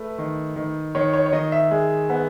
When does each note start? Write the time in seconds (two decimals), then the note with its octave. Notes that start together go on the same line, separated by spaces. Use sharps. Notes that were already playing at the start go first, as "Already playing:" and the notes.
Already playing: A3 B4
0.18 D#3
0.56 D#3
0.95 D#3 C#5
1.14 C#5
1.26 C#5
1.32 D#3 D#5
1.52 E5
1.71 G#3
2.10 B3